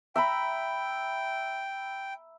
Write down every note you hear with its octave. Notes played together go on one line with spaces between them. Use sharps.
E5 G5 A#5 B5